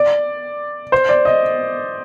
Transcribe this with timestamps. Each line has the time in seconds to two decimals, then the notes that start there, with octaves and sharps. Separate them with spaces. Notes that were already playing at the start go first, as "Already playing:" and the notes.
Already playing: D5
0.92 C5
1.09 D5
1.25 D#5